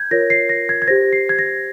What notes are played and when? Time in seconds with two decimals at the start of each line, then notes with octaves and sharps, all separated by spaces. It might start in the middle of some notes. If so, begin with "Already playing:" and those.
Already playing: G6 G#6
0.11 F4 A#4 C#5 A#6
0.30 C7
0.49 A#6
0.69 G#6
0.82 G#6
0.87 G4 C5 A#6
1.13 C7
1.29 G#6
1.39 A#6